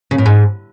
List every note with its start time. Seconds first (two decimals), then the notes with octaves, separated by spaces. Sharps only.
0.11 C#3
0.18 A2
0.26 G#2